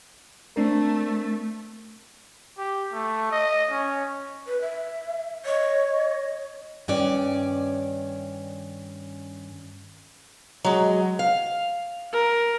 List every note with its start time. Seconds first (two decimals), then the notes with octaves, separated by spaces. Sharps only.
0.56 A3 C4 D4 A#4
2.58 G4
2.93 A3
3.32 D#5
3.71 C#4
4.46 B4
4.61 E5
5.45 C#5 D#5
5.88 D#5
6.88 G2 D#3 C#4 C#5 D5
10.64 F#3 G#3
11.19 F5
12.12 A#4